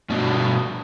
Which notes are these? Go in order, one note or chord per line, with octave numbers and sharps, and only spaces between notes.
G2 B2